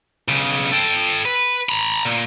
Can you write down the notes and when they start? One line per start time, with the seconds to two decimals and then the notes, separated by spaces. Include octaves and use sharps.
0.28 B1 C#3
0.72 A4 G5
1.25 B4
1.69 A#5 B5
2.05 A#2